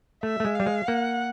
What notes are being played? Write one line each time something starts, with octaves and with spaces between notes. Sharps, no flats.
A3 E5
A3
G#3
G3 F5
G#3
A#3 F#5